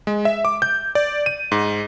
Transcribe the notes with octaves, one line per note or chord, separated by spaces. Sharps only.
G#3
E5
D6
G6
D5
D#7
G#2